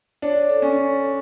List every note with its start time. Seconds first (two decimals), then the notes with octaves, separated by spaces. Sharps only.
0.22 D4 C#5
0.50 A4
0.62 C#4